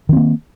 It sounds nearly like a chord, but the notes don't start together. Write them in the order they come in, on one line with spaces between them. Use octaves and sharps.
D#3 C4 A#3